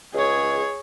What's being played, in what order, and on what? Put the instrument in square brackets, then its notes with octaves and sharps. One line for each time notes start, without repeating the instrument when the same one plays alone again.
[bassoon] C#2 [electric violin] G#4 C#5